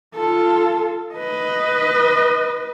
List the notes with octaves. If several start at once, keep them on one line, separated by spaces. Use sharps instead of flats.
F4 A4
B4 D#5